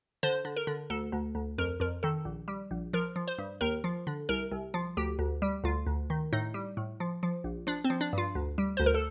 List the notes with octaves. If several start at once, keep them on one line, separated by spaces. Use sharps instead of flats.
D3 C5
D3
A#4
D3
D2 A4
D2
D2
F2 A#4
F2 A#4
D#3 A4
A#1
G3
A#1
F3 A#4
F3
C5
G2
D#2 A#4
F3
D3
C2 A#4
C2
F3
D2 G4
D2
G3
D2 F4
D2
D#3
A2 D#4
G3
A2
F3
F3
A#1
F3 D4
C4
F3
D4
G2 F4
D2
G3
D2 C5
A#4
A4